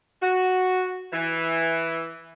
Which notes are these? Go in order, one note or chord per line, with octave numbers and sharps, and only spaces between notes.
F#4
E3